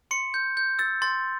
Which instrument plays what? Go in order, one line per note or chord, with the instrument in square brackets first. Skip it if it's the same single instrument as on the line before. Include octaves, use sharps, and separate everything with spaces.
[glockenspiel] C6 C#7
G6
G6
E6 A6
C6 A6